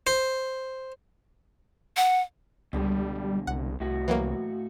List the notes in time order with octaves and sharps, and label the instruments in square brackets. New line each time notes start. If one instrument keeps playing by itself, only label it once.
[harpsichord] C5
[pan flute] F#5
[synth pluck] C#2 [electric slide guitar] B2 D3 G#3 [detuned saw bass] G3
[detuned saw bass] C2 [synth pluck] F#5
[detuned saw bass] C2 [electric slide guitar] A2 F#4
[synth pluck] E3 F#3 A#3